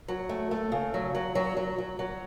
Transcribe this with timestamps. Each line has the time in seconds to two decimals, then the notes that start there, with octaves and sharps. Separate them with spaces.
0.08 F#3
0.29 A3
0.51 A3
0.72 C#3
0.94 F#3
1.15 F#3
1.35 F#3
1.57 F#3
1.78 F#3
1.99 F#3